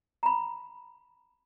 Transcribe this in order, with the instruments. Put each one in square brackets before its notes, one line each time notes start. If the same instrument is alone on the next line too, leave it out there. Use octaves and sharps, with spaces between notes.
[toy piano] A#5 B5